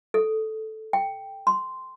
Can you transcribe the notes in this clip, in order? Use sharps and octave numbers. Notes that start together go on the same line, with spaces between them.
A4
G5
C6